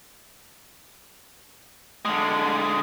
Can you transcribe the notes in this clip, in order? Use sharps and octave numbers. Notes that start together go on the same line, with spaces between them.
D3 G#3